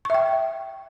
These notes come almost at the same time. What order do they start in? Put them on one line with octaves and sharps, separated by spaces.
C#6 E5 G5